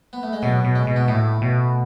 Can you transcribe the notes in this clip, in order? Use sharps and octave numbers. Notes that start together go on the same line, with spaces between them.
B3
A3
G#3
B2 F#3
B2
G#3
B2
B3
A2 A3
B2